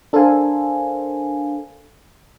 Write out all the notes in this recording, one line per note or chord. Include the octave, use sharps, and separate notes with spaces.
D4 A4 A#4 C5 F5 G#5